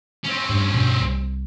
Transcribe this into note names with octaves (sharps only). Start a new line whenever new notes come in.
C4 C#4
G2 A3
G2 B2 F3
C2